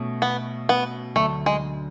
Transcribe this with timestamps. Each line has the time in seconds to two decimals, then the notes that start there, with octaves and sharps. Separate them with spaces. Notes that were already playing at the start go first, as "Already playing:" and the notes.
Already playing: B2 A3 C#4
0.22 B3
0.69 B3
1.15 D2 D3 F#3 A3
1.46 G#3